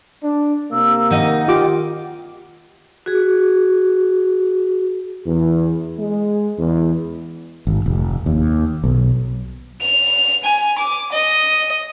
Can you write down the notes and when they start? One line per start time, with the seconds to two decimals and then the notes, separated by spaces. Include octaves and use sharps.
0.24 D4
0.72 C3 A#3 A#4 E6
1.10 D#3 D#4 D#5 F#5
1.48 F4 G4 D6
3.06 F#4 G#4
5.26 E2
5.99 G#3
6.58 E2
7.67 G#1
7.86 F1
8.26 D#2
8.84 B1
9.82 F7
10.44 G#5
10.78 D6
11.12 D#5